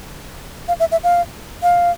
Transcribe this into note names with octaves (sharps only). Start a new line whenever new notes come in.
F5
E5
E5
F5
F5